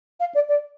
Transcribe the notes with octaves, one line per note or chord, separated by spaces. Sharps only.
F5
D5
D5